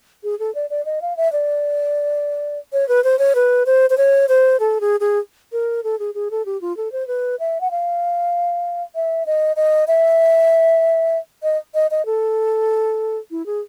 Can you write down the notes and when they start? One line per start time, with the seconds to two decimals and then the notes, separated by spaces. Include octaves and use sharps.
0.23 G#4
0.39 A4
0.55 D5
0.70 D5
0.85 D#5
1.02 F5
1.17 E5
1.32 D5
2.73 C#5
2.88 B4
3.04 C5
3.19 C#5
3.35 B4
3.66 C5
3.90 C5
3.98 C#5
4.29 C5
4.60 A4
4.80 G#4
5.00 G#4
5.52 A#4
5.84 A4
5.99 G#4
6.14 G#4
6.31 A4
6.45 G4
6.61 F4
6.77 A4
6.92 C5
7.07 B4
7.40 E5
7.61 F#5
7.71 F5
8.95 E5
9.26 D#5
9.56 D#5
9.88 E5
11.43 D#5
11.74 D#5
11.91 D#5
12.06 A4
13.31 E4
13.46 G#4